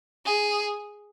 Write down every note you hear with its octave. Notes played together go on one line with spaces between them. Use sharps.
G#4